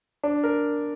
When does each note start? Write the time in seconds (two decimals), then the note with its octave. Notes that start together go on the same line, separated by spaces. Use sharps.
0.23 D4
0.44 A#4